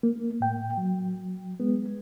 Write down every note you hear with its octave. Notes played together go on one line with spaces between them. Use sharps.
A#3
A2 G5
F#3
G#3 B3